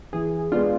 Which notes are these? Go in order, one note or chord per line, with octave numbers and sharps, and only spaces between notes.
E3 G#4
G#3 B3 D4 F4